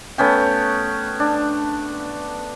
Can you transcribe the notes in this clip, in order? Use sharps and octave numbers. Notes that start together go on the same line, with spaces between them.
A3 B3 C#4 G5
D4